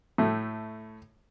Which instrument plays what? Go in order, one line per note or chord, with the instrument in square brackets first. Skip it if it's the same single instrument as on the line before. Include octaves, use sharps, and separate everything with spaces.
[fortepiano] A2 A3